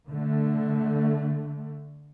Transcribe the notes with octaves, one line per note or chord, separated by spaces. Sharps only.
D3 A3